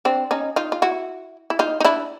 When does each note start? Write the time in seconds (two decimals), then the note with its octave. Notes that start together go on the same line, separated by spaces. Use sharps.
0.05 C4 D4
0.31 C#4 D#4
0.56 D#4 F4
0.72 F4
0.82 E4 F#4
1.50 E4
1.59 D#4 F4
1.80 D#4
1.84 D4 E4